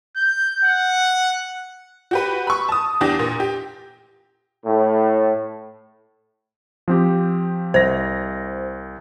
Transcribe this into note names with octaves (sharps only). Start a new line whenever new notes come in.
G6
F#5
F#4 G4 B4
B5 C#6
A5 D#6
E2 D4 G4 A#6
A#2
G4
A2
F3 C4 G4
C2 C5 A#6